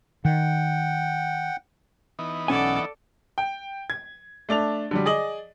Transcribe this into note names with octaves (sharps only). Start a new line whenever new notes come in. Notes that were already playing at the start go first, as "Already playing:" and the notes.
D#3 F#5 G5
E3 B3 D#4
B1 C#4 A4 D5 F#5 G#5
G5
G#6
A3 D4 A6 F7
D3 F#3 G3
G#4 D5 D#5 F#7